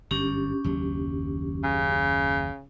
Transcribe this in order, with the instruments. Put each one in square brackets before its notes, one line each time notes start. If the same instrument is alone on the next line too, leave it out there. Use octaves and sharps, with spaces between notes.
[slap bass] G1 F#2 [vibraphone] C#4 D4 G4
[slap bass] F#1 D#2 F#3
[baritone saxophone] C#3